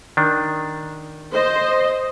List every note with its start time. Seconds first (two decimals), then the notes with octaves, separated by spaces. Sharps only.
0.17 D#3 D4
1.33 C5 D#5